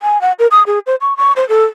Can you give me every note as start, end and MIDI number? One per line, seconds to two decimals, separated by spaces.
0.02 0.20 80
0.21 0.32 78
0.39 0.47 70
0.51 0.63 87
0.67 0.79 68
0.86 0.95 72
1.01 1.16 85
1.17 1.32 85
1.36 1.47 72
1.49 1.64 69